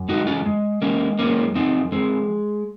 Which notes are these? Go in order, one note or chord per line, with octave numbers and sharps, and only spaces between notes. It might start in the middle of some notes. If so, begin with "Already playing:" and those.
Already playing: F#2
G#3 D#4 F#4
C#4 F4
G#3
G#3 A#3 C#4
F#2 A#3 C#4
F3 C4 D#4
G#3 C4